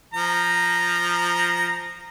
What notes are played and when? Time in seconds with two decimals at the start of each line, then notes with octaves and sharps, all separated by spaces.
0.14 F3 A#5